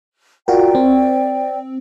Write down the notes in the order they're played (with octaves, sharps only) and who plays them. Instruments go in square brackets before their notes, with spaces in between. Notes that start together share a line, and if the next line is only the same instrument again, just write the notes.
[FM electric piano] F4 F#4 A#4 [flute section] D5 G5
[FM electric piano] C4